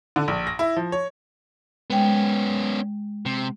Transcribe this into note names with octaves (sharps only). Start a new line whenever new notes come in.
D3
A#1
A#6
E4
F3
C#5
G#3 B3 C#4 G5
C3